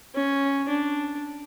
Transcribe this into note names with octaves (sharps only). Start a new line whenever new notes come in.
C#4
D4